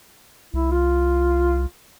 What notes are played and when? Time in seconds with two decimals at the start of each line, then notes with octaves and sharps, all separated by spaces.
0.54 C2 E4
0.71 F4